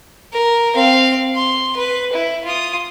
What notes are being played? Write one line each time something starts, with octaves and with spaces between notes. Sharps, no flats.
A#4
C4 F5
C6
B4
E4
F4 D#6